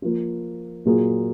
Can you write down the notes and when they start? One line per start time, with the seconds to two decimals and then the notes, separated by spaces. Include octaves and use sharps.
0.02 F3 A#3 F4
0.85 A#2 F#3 A#3 F4 G#4